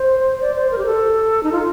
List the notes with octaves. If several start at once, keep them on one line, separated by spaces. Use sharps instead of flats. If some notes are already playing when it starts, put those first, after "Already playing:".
Already playing: C5
D5
C5
A#4
G4
A4
D#4
F4